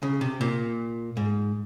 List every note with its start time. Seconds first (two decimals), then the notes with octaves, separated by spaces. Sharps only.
0.03 C#3
0.21 C3
0.41 A#2
1.17 G#2